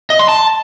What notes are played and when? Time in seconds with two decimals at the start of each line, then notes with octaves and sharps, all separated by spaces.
0.10 D#5
0.19 C6
0.29 A5